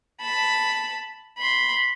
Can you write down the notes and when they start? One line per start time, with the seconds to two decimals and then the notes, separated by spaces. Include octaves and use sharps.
0.21 A5 B5
1.38 B5 C6